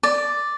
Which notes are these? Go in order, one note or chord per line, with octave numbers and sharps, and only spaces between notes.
D5